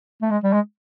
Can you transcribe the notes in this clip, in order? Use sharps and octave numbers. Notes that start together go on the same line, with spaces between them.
A3
G#3
G3
G#3